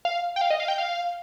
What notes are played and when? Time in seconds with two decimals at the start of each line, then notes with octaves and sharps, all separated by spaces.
0.05 F5
0.36 G5
0.41 F5
0.50 D#5
0.60 F5
0.68 G5
0.78 F5